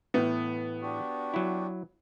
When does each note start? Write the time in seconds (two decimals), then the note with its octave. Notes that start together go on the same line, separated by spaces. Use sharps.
0.14 A2 E3 A3 B3
0.82 D4 F#4 G4
1.34 F#3 E4